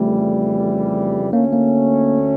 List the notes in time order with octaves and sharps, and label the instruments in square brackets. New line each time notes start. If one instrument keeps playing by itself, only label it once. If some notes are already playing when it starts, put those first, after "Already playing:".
Already playing: [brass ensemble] F2 C#3 E3 G3 [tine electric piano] A3
[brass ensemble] D2 D3 A3 C#4 [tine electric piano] A#3
[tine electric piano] A#3